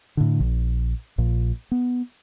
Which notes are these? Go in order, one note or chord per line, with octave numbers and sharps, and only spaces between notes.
A2 D3
A#1
A#1 A#2
B3